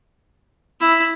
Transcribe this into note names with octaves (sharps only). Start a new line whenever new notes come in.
E4